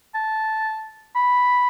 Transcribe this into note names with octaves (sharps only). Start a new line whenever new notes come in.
A5
B5